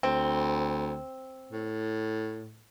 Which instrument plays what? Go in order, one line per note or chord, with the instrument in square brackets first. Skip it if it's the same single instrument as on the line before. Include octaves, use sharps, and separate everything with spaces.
[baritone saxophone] D2 [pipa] C4
[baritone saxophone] A2